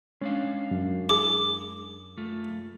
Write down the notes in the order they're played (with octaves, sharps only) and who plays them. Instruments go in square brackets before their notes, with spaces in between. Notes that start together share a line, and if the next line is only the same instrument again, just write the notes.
[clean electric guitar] G#3 D4 F5 [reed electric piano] C#4
[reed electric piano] F#2
[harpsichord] E4 G#4 [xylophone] D6
[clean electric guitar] A3 F4